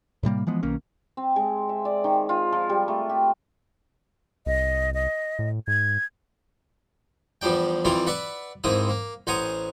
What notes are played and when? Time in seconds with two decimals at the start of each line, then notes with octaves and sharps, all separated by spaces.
0.23 A2 C3 G3 A#3
0.47 E3 F3 G#3 B3
0.63 B1 D#3 A#3 C#4
1.17 C4
1.36 G#3
1.69 E5
1.85 D5
2.04 D#3
2.29 F4
2.52 F3
2.69 G3
2.88 A3
3.09 G4
4.46 C2 D#5
4.94 D#5
5.39 A2
5.68 G#2 G#6
7.41 E2 F3 G3 D4 G5
7.85 F2 E3 G3 F4 D5
8.07 B4 D5 E5 F#5
8.64 G#2 A#3 C4 E4 D#6
8.89 A#3
9.27 A1 C5 F#5 G#5 A#5 D#6